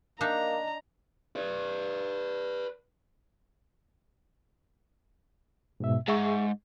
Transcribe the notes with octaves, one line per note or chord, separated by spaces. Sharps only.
A#3 D4 D#4 A#5
B4 D5
G#2 B2 E5
G#2 G#4 E5 C#6